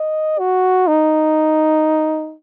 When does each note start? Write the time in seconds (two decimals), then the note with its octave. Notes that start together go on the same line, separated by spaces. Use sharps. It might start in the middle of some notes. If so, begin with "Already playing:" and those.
Already playing: D#5
0.39 F#4
0.87 D#4